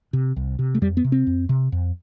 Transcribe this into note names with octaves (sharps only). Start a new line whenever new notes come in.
C3
C2
C3
A3
F2 G3
B3
C3
C4
F2
C3
F2